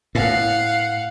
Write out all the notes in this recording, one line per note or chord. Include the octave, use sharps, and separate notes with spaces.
A2 F5 F#5